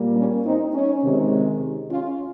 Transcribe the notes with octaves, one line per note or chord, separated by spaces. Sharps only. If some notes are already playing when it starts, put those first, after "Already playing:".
Already playing: A#2 G3 A#3
C#4
C4 D#4
C#4
C3 D#3 G#3
C#4 F4